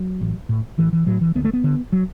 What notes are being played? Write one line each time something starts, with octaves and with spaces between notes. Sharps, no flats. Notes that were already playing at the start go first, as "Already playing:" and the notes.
Already playing: F#3
A1
A2
A1 E3
E3
A2 F#3
E3
D2 B3
A3
B3
D3
F#3